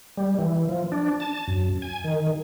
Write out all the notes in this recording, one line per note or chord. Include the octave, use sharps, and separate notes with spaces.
G3
E3
F3
D4
A5
F#2
G#5
D#3